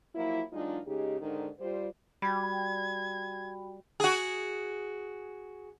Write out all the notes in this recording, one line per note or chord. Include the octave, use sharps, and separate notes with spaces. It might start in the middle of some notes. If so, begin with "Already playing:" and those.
F3 F#3 A#3 E4
E3 F#3 G#3 D4 D#4 F4
C#3 G#3 D#4 G4
G#2 D3 D#3
G3 F4 C5
G3 F#4 G5 B5 G#6
F#4 G#4